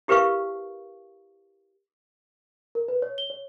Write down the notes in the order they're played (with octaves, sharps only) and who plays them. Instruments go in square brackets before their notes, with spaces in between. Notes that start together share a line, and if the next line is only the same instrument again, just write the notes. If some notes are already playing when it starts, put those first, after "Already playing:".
[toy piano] E4 G4 A#4 B4 F5 C#6
[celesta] A#4
B4
C#5
G7
C#5